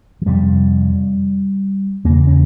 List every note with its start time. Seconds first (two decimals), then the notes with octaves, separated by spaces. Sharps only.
0.22 F3
0.26 F2 C3 G3
2.04 E2 C#3 A#3
2.27 C#4